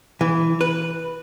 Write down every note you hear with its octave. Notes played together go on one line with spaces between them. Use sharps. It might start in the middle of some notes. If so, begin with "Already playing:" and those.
E3
B4